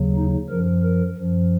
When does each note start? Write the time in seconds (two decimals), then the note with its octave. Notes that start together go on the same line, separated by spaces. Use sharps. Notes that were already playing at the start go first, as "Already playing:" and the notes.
Already playing: D#2 C#3 F#3
0.16 D#4
0.49 F#2 F3 A#4
0.82 A#4
1.16 F#2 F3